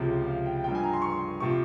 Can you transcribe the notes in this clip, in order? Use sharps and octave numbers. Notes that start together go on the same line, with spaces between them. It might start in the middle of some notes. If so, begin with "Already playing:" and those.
Already playing: C#2 C3 F3
F5
G5
G2 F3 G5
G#5
A#5
C6
C#6
C6
C3 F3 C#6